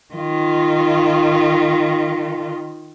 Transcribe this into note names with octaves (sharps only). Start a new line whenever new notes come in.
D#3 F4